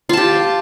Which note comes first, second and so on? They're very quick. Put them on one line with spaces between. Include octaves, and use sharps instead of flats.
F4 A5 G4